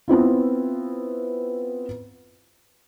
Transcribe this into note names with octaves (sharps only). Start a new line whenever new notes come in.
B3 C4 E4 F4